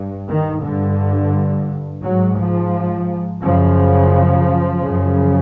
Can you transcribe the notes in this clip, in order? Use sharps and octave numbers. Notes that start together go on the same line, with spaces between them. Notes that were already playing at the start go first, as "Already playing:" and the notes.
Already playing: G2
D#3
G2 D3
G#2 F#3
F3
F#2 C#3 F3
F#2 C#3